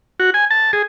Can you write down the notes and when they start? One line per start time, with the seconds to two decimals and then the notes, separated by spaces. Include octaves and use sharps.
0.20 F#4
0.34 G#5
0.51 A5
0.73 G#4